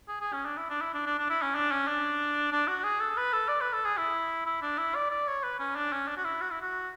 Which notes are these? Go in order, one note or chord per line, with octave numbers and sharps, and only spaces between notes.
G#4
G#4
C#4
D4
E4
D4
E4
D4
D4
D4
E4
C#4
D4
C#4
D4
D4
F#4
G#4
A4
B4
A4
D5
B4
A4
G#4
E4
E4
D4
E4
D5
D5
C#5
B4
C#4
D4
C#4
D4
F#4
E4
F#4
E4
F#4